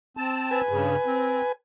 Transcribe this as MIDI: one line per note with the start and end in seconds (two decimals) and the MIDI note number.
0.17 0.61 60
0.17 0.61 81
0.51 1.52 71
0.51 1.52 80
0.69 0.96 43
0.69 0.96 49
1.06 1.42 60